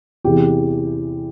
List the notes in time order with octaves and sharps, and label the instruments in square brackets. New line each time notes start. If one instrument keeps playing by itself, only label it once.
[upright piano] E2 C3 E3 G4